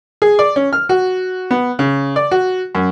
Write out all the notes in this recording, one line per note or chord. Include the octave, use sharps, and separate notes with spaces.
G#4
D5
C#4
F6
F#4
B3
C#3
D5
F#4
F#2